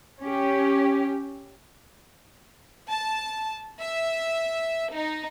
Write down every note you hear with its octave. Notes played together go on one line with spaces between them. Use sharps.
C#4 G4
A5
E5
D#4